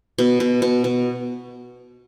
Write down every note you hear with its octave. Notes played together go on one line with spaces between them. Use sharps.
B2
B2
B2
B2